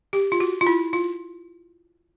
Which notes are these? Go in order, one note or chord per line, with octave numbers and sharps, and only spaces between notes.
G4
F4
F#4
F4
E4
F4